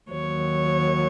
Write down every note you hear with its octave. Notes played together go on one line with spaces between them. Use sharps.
D#2 D#3 F#3 C#5